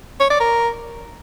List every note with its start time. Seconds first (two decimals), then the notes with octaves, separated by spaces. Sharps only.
0.20 C#5
0.30 D5
0.40 A#4